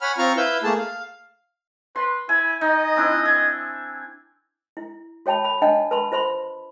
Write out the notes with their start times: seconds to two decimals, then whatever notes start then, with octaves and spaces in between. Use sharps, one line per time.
0.01 C#5 F#5 G#5 B5 F6
0.18 C4 F4 F5 A#5 C#6 F6
0.37 E4 B4 F5 E6 G6
0.64 A3 A#3 G#4 A5
0.78 F5
1.96 B4 C6
2.29 E4 G#5
2.61 D#4 D#5
2.96 C4 D4 E4
3.25 G#5
4.77 E4
5.26 F#4 C#5 G5 A5 B5
5.45 B5
5.62 D4 D#5 F#5 G5 A5
5.91 B4 A5 B5 C6
6.12 F4 C5 B5 C6